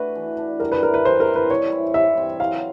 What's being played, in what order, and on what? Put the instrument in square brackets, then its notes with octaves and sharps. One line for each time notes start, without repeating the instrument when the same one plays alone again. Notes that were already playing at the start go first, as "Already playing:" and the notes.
Already playing: [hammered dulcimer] A3 D4 F#4 [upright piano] B4
[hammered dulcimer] E3
D4
[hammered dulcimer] G3 [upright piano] A#4
[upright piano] B4
[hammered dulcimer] E4 [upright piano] A#4
[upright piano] B4
[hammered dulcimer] E3 [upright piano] C5
[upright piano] A#4
[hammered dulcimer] C4
[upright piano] B4
[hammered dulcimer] G3 [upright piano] C#5
[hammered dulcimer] E4
[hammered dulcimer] E3 [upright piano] E5
[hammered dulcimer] C4
[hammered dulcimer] F#3 [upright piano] F5